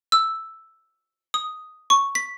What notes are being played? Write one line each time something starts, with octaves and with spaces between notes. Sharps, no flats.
E6
D#6
C#6
B6